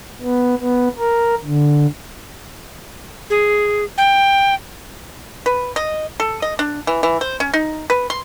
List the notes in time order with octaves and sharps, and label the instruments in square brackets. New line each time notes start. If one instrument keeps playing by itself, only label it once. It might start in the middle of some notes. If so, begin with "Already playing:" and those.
[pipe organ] B3
B3
A#4
D3
[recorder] G#4
G5
[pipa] B4
D#5
A4
D#5
D4
E3
E3
C5
C#4
D#4
B4
C6